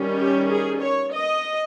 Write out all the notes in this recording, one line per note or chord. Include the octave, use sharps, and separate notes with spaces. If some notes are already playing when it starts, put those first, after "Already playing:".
Already playing: D#3 G3 C#4
G4
G#4
C#5
D#5